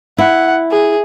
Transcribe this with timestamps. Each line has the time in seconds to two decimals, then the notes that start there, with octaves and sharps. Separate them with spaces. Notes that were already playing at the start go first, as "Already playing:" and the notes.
0.18 E4 F#5
0.71 G#4